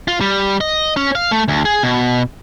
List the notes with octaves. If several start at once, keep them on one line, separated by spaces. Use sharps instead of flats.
F4
G3
D#5
C#4
F5
A3
D2
G#4
B2